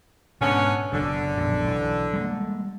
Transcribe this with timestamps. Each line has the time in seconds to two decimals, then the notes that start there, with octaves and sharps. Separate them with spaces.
0.41 G#2 B2 D3 B3 C#4
0.92 F#1 B2 D3
1.37 A#1 F#2 B2
1.67 B1 E3
2.13 G3 G#3 A#3